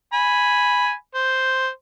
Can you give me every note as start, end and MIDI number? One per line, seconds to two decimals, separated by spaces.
0.13 0.93 80
0.13 0.93 83
1.15 1.68 72